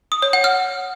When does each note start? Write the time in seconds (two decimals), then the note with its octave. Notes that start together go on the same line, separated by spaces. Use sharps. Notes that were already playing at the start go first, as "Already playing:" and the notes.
0.12 D#6
0.22 C#5
0.33 F#5
0.44 F6